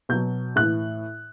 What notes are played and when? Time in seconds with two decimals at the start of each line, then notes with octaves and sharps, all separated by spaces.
0.09 B2 F#3 G6
0.56 A2 E3 F#6